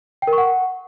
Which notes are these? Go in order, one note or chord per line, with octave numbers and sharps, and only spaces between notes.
G5
A#4
C#6
F#5